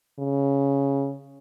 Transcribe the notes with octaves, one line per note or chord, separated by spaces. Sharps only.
C#3